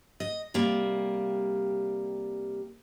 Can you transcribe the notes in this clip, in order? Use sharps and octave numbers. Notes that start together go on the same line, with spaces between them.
D#5
C3 G3 A#3